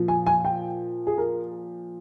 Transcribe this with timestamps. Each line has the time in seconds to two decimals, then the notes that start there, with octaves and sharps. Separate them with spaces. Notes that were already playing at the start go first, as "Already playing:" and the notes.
Already playing: A#2 F3
0.08 G#5
0.26 G#5
0.45 G5
1.07 G#4
1.18 A#4